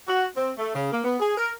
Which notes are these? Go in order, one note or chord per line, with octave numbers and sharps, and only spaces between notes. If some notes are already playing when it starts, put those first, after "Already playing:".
F#4
C4
A3
C#3
A#3
B3
G#4
A#4